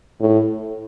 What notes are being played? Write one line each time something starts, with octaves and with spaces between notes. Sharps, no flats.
A2